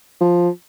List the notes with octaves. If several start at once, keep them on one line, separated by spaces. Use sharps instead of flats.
F3